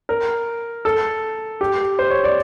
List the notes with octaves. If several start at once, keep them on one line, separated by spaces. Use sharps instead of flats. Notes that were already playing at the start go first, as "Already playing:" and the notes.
A#4
A4
G4
C5
C#5
D5